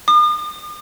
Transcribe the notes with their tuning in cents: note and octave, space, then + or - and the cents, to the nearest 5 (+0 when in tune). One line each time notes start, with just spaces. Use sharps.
D#6 -45